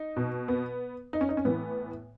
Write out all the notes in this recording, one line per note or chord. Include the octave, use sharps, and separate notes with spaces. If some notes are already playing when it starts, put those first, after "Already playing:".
Already playing: D#4
B2
B3
D#4
C#4
D#4
C#4
A2 E3 B3